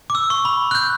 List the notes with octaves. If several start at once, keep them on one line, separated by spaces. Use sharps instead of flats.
D6
E6
C#6
B5
F#6
G6